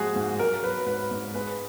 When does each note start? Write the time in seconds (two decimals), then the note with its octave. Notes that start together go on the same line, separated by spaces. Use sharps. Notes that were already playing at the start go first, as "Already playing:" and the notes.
Already playing: G#2 F3 G#3 F#4 G#4
0.16 G#2
0.39 F#3 A#4
0.62 F#3 B4
0.86 G#2 B4
1.11 G#2
1.34 G#3 B4